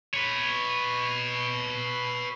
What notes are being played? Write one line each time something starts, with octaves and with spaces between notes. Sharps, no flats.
B4 C#5